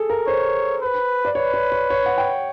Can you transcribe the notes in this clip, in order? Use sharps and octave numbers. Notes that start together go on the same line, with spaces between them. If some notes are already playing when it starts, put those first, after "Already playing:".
Already playing: G#4 A4
A#4
C5 C#5
B4
D5
B4 C#5
C#5
C#5
C#5
F#5
G5